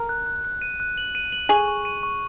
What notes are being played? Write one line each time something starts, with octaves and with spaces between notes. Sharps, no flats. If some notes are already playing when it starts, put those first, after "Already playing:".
Already playing: A#4
F#6
F#6
F#6
D#7
F#6
F#7
D#7
F#7
G#4 C#6
C#6
D#7
C#6